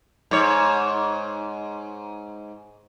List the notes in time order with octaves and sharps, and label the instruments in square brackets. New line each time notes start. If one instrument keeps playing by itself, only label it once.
[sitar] G#2 C#5